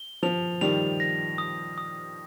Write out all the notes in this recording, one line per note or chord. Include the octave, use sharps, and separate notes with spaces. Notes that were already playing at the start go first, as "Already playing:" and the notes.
Already playing: G7
F3 F7
D#3 G3 F7
A#6
D#6
D#6